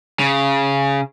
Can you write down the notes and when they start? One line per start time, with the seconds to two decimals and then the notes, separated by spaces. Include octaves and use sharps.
0.20 C#3